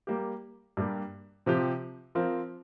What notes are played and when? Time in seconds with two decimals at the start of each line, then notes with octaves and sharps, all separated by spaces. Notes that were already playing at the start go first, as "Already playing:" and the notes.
0.07 G3 A#3 G4
0.77 G2 G3 A#3 G4
1.46 C3 F3 C4 G4
2.15 F3 C4 F4 A#4